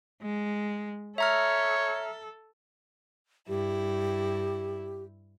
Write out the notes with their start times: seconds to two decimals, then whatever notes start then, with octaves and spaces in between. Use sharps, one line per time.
0.22 G#3
1.18 A4 C#5 E5 A#5 F6
3.48 G2 E4 G4